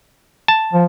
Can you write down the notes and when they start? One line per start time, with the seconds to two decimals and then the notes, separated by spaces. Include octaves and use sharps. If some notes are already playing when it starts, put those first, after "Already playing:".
0.48 A5
0.73 F3